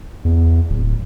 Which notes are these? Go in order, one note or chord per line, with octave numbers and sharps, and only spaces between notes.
E2
D1